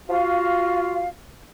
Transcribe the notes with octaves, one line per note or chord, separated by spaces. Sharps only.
F4 F#4 F5